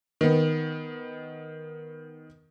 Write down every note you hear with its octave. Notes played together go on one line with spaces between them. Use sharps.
D#3 B3